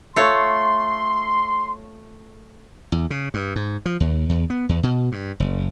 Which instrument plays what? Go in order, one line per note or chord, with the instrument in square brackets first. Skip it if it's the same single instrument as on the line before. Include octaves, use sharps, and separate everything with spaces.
[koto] A3 F4 C#5 [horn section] C6
[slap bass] E2
C#3
G2
G#2
F3
D#2
E2
B3
E2
B2
G2
F#1